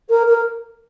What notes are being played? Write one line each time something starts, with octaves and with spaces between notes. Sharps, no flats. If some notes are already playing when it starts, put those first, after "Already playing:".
A#4
A#4